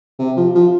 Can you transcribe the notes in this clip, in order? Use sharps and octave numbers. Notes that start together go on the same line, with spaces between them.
C3
F3
F3